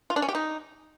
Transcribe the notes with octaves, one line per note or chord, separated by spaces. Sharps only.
F4
D4
C#4
G4
D#4